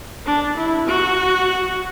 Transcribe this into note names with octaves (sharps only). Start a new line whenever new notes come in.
D4
E4
F#4